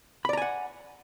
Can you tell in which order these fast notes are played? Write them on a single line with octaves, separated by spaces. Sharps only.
B5 D5 A#5 G#5 F#5